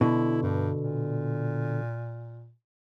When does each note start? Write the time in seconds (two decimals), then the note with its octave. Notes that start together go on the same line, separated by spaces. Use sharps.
0.01 B2 D3 E4
0.43 G2
0.81 A#2